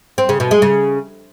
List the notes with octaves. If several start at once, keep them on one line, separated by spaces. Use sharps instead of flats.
C4
C#3
B2
G#3
C#3